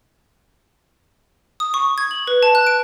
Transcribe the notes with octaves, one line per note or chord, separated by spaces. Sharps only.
D#6
C#6
G#6
F#7
B4
A5
F#6
D7